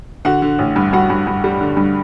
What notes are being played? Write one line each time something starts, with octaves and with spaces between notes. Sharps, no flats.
D3 F#4 F#5
D3
A1
G2
G2 F#4 F#5
G2
G2
G3
D3
G2